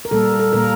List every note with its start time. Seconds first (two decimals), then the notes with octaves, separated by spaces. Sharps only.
0.05 A#4
0.11 A#2 G3 A#3 A4
0.40 A4
0.53 A#2 G3 A#3 A#4